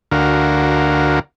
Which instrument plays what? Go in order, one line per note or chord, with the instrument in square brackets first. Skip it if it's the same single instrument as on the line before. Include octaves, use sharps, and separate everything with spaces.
[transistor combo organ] D2 D3 F#4 A#4 F5